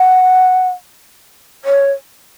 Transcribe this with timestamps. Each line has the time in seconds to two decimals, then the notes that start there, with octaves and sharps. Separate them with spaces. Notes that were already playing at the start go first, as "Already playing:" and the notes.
Already playing: F#5
1.65 C#5